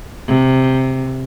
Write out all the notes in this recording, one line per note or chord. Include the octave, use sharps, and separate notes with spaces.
C3